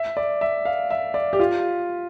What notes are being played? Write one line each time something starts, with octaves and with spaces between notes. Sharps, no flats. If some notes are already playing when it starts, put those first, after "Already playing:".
Already playing: E5
D5
E5
F5
E5
D5
G4
F4